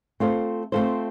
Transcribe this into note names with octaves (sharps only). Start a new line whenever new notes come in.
A3 C4 F4 A4 C5
A3 C4 F4 A4 C5